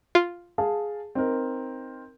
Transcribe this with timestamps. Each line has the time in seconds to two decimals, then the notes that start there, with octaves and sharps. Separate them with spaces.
0.15 F4
0.58 G#4 F5 A5
1.15 C4 D#4 A#4